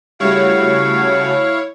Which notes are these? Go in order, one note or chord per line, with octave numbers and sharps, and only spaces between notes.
C#3 G3 A3 E4 F#4 C#5 F5